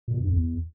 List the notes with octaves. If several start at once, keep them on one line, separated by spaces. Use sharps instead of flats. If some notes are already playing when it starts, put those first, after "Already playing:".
A#2
B2
G2
F2
E2